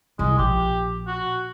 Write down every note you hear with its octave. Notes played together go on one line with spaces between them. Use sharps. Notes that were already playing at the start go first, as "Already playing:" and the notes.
C2 G#3
A#1 G4
F#4